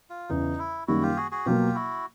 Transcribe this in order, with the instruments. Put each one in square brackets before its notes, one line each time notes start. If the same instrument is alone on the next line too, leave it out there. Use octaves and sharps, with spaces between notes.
[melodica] F4
[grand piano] E2 C#3 E3 [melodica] D#4
[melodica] E4
[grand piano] F#2 D#3 G3 A#3 [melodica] E4 F#4
[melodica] F4 G4
F#4 G#4
F#4 G#4
[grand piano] B2 F#3 A#3 [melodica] F4 G4
[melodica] E4 F#4